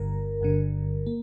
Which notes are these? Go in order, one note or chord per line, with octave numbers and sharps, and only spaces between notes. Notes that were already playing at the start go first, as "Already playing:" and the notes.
Already playing: G1 G2 D3 A#4
G1 G2 D3
A#3